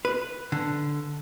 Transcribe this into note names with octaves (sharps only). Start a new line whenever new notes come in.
B4
D3